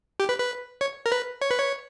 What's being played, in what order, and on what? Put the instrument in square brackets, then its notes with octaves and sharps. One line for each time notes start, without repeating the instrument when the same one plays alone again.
[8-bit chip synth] G4
B4
B4
C#5
A#4
B4
C#5
B4
C#5